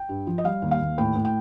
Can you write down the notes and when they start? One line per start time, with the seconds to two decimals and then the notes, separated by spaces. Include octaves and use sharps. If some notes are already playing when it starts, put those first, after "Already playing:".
Already playing: G5
0.09 G2
0.27 F3
0.38 D#5
0.44 G3 F5
0.62 D#2
0.71 F5
0.80 D#2
0.98 A2 G5
1.16 A2
1.25 G5